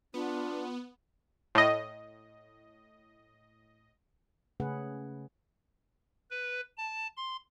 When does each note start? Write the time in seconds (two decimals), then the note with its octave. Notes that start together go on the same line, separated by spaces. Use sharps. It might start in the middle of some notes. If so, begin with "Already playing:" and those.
0.14 B3 D4 F4
1.55 A2 D#5
4.60 C#3 A3 C#4 G#4 B4 F#5
6.30 B4
6.77 A5
7.17 C6